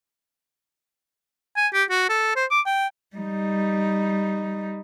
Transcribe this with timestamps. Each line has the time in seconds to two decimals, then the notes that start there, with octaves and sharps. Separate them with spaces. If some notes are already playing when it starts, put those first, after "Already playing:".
1.57 G#5
1.73 G4
1.90 F#4
2.09 A4
2.36 C5
2.51 D6
2.66 G5
3.16 G3 D#4